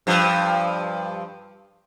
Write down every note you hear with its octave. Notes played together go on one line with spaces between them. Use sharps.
G2 F3